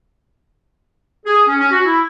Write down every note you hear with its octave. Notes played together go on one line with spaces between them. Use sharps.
G#4
C#4
C#4
F#4
E4